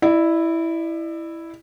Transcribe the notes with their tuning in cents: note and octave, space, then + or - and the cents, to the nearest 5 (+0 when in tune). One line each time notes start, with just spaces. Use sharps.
E4 +0 D5 +40